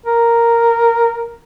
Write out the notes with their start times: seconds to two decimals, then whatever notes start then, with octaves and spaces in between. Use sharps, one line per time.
0.06 A#4